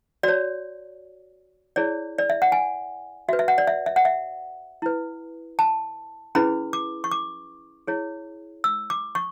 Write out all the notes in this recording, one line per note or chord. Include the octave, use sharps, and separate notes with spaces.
F#4 C#5 D5
E4 G#4 C#5 D5
D5
E5
F#5
G#5
F#4 B4 E5
E5
F#5
D5
E5
E5
F#5
E5
E4 B4
A5
C#4 E4 G#4 B4 B5
D6
C#6
D6
E4 G#4 C#5
E6
D6
C#6